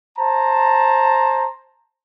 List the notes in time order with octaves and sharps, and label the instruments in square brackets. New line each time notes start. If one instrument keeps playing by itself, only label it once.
[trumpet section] C5 A5 A#5